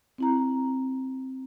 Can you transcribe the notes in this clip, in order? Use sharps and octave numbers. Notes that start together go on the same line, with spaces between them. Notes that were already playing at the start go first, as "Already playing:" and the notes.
C4 E4 A#5